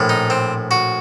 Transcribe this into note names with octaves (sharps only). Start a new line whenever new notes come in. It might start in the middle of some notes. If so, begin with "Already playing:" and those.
Already playing: A#1 A2
D#4
C4
F#4